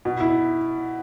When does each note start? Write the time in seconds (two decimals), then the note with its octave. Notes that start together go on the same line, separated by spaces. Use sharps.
0.05 B2
0.20 E4